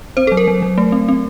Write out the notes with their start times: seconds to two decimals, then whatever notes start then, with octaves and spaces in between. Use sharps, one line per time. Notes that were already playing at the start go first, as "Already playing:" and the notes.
0.17 C4 C5
0.27 F#3 A4
0.37 A#4
0.48 F#3
0.62 F#3
0.78 A3
0.92 C4
1.09 C4